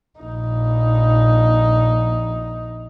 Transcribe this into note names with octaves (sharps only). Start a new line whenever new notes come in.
A#1 D#4